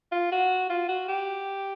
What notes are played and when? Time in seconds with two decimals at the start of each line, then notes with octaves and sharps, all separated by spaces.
0.12 F4
0.32 F#4
0.70 F4
0.89 F#4
1.08 G4